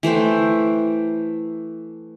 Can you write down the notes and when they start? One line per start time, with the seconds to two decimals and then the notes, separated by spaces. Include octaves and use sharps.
0.03 E3 A3 C5 G5